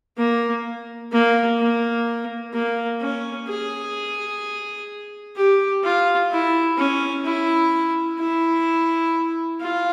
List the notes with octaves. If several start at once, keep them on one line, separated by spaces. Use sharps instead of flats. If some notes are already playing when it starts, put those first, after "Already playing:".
A#3
A#3
A#3
A#3
C#4
G#4
G4
F4
E4
C#4
E4
E4
F4